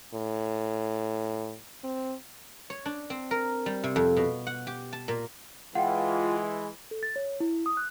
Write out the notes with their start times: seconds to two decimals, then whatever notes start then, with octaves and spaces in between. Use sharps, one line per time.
0.14 A2
1.84 C4
2.70 C#5
2.86 D4
3.10 C4
3.31 A#4
3.66 G3
3.84 C3
3.96 F2
4.17 B2
4.47 F#5
4.67 G4
4.93 A5
5.08 A#2
5.75 E3 G#3 F4 F#5 G5
6.91 A4
7.03 A6
7.16 C#5
7.40 E4
7.66 D#6
7.77 F#6